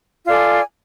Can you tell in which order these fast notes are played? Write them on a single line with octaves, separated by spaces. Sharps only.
F4 D5 A4 G#5